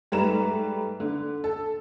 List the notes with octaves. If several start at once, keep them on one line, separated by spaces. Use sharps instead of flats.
G#2 G3 A3 B4 A#5 E7
D3
A4